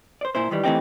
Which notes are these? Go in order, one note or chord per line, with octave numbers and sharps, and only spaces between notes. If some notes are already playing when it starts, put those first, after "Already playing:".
C5 D5
A#2 E4 C5
G2 D#3 E3 G3
E3 A3 C4 D#4 G4